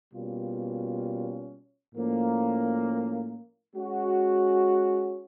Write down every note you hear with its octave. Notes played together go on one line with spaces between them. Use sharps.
B2 G3 A#3 C#4 F4
A2 F3 A#3 C#4
G#3 C#4 F#4